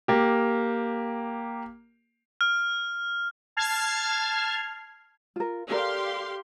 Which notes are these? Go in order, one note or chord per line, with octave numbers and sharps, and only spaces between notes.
A#3 G4
F6
A5 F6 G#6 C7
F4 A#4
G4 A4 A#4 D5 F5 C6